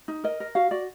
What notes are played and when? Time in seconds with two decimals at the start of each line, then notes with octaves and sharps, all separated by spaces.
0.08 D#4
0.24 A#4 D#5
0.40 A#4
0.55 F#4 F5
0.71 F#4 D5